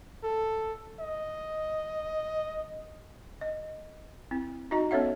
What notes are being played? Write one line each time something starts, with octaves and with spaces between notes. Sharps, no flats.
A4
D#5
D#5
C4 E4
D#4 F#4 D#5 A#5
B3 C#4 A4 C#5 E5 F#5